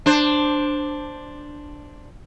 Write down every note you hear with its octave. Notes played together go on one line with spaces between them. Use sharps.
D4 C5